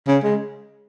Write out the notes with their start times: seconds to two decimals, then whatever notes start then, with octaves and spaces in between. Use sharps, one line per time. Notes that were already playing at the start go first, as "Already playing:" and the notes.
0.07 C#3
0.24 G#3